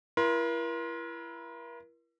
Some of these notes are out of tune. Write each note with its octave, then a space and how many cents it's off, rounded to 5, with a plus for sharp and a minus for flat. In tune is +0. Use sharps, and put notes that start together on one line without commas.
E4 +35 A#4 +40 C6 +0